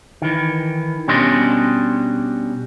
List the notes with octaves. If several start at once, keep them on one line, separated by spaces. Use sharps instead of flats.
D#3 E3
B2 G3 C#4 D4 D#5 C6